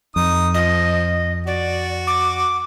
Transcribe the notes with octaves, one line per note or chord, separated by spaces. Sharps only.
F2 D#4 D#6
F3 D#5
F#4 D5
D6